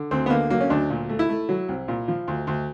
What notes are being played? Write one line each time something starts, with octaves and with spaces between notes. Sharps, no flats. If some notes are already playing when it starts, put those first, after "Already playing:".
Already playing: D3
D2 C4
B3
D3 A#3
F#3 A#3
C#4
D2 D4
A#2
A3
E4
A3
F#3
C2
A#2
F3
D2
D2